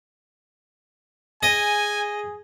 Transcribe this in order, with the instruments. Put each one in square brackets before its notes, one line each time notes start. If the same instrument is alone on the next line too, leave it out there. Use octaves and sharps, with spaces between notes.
[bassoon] G#4 [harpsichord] D#5 [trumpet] G#5